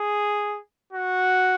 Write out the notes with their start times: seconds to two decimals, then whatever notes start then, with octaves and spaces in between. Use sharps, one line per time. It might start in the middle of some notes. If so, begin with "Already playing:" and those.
Already playing: G#4
0.93 F#4